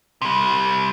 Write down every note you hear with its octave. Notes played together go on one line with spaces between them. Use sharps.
C3 G3